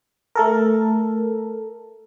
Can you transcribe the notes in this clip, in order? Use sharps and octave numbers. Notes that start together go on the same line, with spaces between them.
A3 A4 A#4